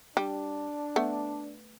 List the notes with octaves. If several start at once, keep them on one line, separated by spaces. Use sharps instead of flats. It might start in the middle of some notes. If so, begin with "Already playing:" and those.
G3 D4
A3 B3